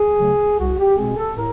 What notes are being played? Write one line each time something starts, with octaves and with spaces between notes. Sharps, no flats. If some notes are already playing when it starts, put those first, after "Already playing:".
Already playing: G#4
C#3 F#3 A3
C2 F#4
G4
B2 G#3 C4 G#4
A4
A2 A#4